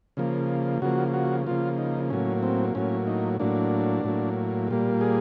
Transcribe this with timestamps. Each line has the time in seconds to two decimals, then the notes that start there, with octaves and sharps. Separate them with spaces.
0.17 C#3 F3 A#3
0.82 C#3 F3 A#3 F#4
1.14 F#4
1.47 C#3 F3 A#3 F4
1.78 D#4
2.10 A2 F#3 A#3 C#4
2.43 C4
2.75 A2 F#3 A#3 C#4
3.07 D#4
3.40 A2 F#3 A#3 D4
4.04 A2 F#3 A#3
4.68 A#2 G3 A#3
5.01 G#4